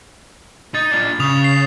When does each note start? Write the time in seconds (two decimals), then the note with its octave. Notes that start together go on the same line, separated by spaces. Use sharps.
0.75 D#4 D#5 A6
0.92 D4 F4
1.20 C#3 D#6 F7
1.44 C7